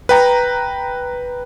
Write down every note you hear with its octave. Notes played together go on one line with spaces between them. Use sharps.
B4 G5 A#5